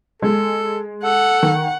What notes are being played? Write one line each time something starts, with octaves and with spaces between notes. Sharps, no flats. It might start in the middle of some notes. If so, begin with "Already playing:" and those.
G#3 A4
A4 F#5
D#3